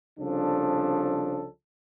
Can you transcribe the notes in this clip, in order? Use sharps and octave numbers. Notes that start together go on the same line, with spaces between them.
C2 C#3 F3 D4 A4